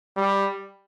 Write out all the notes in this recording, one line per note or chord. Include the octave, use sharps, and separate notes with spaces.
G3